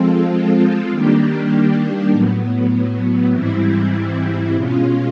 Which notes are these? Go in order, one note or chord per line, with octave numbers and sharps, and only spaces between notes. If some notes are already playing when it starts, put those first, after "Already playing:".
Already playing: F3 G#3 C4 F4 A4
D#3 G3 A#3 D4 G4
A2 F#3 B3
G#2 E3 G3 C4 E4
B2 G#3 C#4 F4